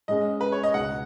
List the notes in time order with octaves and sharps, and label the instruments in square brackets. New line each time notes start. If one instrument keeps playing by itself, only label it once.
[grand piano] G#2 G#3 C#4 [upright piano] D#5
[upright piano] B4
C#5
D#5
[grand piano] C#2 B2 B3 D#4 [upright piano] F#5